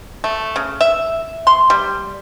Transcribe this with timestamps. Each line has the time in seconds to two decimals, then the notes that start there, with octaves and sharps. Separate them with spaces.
0.24 A3
0.56 C#3
0.81 E5
1.47 C6
1.70 G3